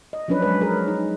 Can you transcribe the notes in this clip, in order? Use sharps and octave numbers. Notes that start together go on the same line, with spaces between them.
D#5
F3 F#3 C#4 D4 B4
F#3 G#3 B4
G#4 A#4
D#4